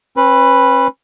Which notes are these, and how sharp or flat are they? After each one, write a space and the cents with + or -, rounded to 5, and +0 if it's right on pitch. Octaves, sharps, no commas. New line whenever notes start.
C#4 -45 B4 +0